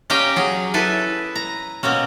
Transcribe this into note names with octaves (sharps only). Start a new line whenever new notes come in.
C#4 G4 F5 G5 G#5 A#5
F#3 G#4
E4 A4 B4 G#5
A#5
B2 A#3 C4 C#4